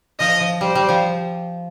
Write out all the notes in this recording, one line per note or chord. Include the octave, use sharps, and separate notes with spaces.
F3 D#5
F3
G3 C5
G3
F3